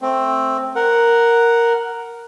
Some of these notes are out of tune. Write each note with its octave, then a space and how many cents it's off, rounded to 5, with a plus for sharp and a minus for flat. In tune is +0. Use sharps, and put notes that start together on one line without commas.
A3 +0 C4 +10
A#4 +0 F#5 +0